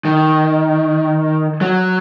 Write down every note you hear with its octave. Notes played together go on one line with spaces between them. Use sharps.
D#3
F#3